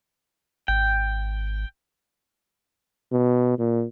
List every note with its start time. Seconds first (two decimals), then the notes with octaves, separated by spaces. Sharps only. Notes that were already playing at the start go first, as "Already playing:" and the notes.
0.68 G#1 G5
3.12 B2
3.59 A#2